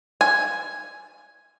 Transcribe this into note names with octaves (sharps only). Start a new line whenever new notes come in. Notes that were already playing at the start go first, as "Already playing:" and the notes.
G#5